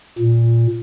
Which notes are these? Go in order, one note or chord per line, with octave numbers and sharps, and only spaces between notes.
A#2